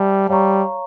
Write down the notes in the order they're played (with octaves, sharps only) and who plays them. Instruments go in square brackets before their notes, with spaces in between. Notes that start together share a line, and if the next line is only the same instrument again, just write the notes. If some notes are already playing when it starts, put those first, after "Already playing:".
Already playing: [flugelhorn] G3 [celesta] C5 E5 A5
[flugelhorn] G3 [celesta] C#5 F5 A#5 C#6